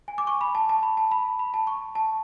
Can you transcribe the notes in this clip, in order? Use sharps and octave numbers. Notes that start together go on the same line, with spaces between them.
G#5
D6
C#6
B5
A5
A5
B5
A5
B5
B5
A5
C#6
A5